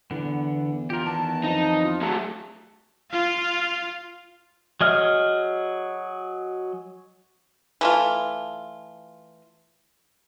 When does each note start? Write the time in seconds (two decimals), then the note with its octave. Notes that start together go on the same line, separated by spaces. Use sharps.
0.11 E2 D3 B3
0.90 F4 G4 A#4
1.06 D#3 E3 B3 A5
1.44 F2 D#4
1.83 F4
2.02 F#3 A3 A5
3.10 F4 F5
4.81 F#3 G#4 D#5 F6
7.81 E3 A3 F4